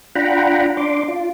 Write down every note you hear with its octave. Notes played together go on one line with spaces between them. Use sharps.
D4 F4 F#5 G5 A#5 B5
D4 C6 D6
F4